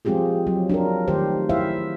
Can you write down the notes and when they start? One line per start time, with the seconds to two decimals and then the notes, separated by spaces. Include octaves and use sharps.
0.05 F3 G#3 C4 F4 G4 G#4
0.47 F#3
0.70 D4 F4 A#4
1.08 D#3 A3 G4 C5
1.49 E4 C5 E5 F5